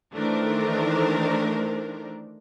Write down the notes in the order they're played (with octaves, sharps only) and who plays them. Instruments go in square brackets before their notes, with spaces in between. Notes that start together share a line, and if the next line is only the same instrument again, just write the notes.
[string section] D#3 E3 A3 D4 A#4 C5